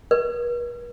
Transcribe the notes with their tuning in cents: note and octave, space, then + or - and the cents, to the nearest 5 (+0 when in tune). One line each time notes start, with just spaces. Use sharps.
B4 -45